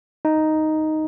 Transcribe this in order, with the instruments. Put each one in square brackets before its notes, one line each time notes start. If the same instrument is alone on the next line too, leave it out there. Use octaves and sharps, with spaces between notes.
[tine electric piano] D#4